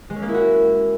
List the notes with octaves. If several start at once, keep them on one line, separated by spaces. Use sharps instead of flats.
G#3
C#4
A#3
E4
F#4